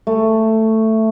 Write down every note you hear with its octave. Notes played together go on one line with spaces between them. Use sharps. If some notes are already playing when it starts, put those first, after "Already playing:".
A3